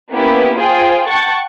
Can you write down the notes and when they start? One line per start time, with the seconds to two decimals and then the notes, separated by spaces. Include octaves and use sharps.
0.12 A#3 B3 C#4 E4 G4
0.57 F4 G#4 C5 G5
1.09 F#5 G5 A5 C#6 A6